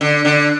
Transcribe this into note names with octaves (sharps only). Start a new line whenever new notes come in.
D3
D3